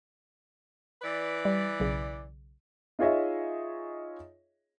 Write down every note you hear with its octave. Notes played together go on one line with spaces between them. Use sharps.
E3 B4 D5
G3
B1 C#3
D#4 F4 G#4 C#5 D#5 E5